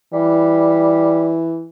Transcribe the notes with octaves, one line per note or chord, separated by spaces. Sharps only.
E3 G3